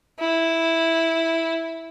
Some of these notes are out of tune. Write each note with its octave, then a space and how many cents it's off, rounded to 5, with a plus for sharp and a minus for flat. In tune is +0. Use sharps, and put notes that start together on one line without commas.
E4 -5